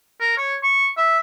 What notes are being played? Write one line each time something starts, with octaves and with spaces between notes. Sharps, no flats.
A#4
C#5
C#6
E5